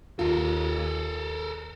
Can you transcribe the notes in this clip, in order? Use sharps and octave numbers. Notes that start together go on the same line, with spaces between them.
D#2 F4 A4 A#4